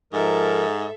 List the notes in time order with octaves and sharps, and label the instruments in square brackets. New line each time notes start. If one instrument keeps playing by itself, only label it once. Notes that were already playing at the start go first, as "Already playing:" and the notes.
[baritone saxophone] G#2 [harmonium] F3 D#4 A#4 [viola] A4 E5